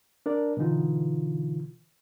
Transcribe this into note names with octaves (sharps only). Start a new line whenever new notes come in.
D4 A#4 D5
B2 D3 E3 D#4 F4